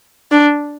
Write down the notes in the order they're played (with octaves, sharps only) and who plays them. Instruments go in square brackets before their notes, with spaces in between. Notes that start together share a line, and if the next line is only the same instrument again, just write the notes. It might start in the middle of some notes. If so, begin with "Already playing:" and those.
[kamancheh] D4